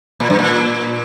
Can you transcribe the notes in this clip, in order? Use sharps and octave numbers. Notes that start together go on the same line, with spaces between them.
A#2
G2
A#2